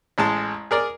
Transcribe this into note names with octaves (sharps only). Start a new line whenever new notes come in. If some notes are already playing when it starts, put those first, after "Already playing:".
A1 G#3 A5
G#4 A#4 D5